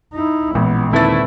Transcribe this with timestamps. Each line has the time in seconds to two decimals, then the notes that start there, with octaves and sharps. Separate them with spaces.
0.13 D#4 E4
0.55 A1 A#2 G#3 B3
0.93 D#2 D3 A3 C4 E4 B4 A6